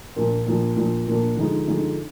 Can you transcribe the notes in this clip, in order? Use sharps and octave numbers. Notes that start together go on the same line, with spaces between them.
A#2 F3 A#3 D4
A#2 F3 A#3 D4
A#2 F3 A#3 D4
A#2 F3 A#3 D4
D3 F3 G#3 D#4
D3 F3 G#3 D#4